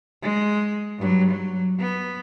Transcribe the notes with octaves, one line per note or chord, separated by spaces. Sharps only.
G#3
G2 F#3
F#3
B3